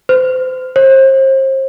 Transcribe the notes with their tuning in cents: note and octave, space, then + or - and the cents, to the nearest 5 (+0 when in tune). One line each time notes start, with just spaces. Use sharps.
C5 -30
C5 +35